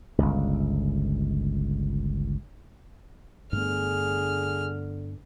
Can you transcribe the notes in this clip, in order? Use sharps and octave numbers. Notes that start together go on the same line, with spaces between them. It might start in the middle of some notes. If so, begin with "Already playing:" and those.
G1 C#2
G2 D3 A3 B3 G#4 F6